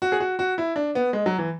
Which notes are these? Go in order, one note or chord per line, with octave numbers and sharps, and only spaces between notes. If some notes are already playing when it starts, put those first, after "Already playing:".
F#4
G#4
F#4
F#4
E4
D4
B3
G#3
F#3
E3